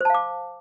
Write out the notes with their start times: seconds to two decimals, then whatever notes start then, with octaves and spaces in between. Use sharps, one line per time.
0.01 C5
0.05 A5
0.10 F5
0.14 D6